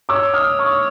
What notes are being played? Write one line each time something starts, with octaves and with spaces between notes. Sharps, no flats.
C#5 D6 E6
D#6 F6
C#6 D#6